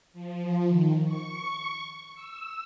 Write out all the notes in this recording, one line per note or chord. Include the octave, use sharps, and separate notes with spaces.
F3
D#3
C#6
E6